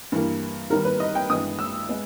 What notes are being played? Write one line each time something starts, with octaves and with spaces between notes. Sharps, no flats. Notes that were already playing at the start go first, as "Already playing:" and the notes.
G2 E3 G3 A#3
D#2 D#3 G3 B3 A#4
B4
D#5
G5
G2 E3 G#3 B3 D#6
E6
G#3 B3